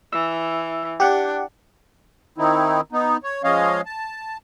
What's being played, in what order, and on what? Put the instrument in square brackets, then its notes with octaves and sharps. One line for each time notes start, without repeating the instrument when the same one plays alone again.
[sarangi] E3 [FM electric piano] E6
[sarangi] D4 [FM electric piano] G4 F#5
[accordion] D#3 C4 D#4 E4
B3 D#4
C#5
F3 G#3 C#4 C#5 D#5 F5
A5